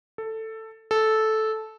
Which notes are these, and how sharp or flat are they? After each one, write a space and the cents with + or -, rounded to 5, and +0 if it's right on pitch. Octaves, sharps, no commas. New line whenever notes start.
A4 +10
A4 -10